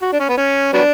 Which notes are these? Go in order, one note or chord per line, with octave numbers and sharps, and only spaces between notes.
F#4
D4
C#4
B3
C#4
F#3 B3 D4